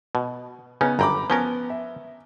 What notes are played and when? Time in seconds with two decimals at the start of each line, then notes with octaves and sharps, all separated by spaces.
0.15 B2
0.81 C#3 B3 C#4 D#4
0.99 G1 F#2 G5 A#5 B5 D6
1.30 F3 B3 C#4 A#4 G7
1.70 E5